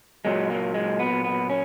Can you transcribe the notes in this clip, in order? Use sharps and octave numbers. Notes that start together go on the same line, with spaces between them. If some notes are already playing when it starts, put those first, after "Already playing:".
A#2 F#3 G#3
A#3
G#3
B3
B3
C#4